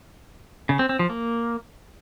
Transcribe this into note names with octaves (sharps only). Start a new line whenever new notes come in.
C#3
C4
C4
F3
A#3